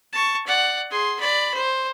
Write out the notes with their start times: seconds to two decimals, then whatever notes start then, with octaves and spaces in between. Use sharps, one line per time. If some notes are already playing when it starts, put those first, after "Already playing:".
0.13 A5 C#6
0.46 D5 F#5
0.91 G#4 C6
1.20 D5 B5
1.54 C5